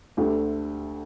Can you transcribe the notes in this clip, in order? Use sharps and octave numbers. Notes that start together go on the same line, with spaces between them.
D2 D3 A3 G4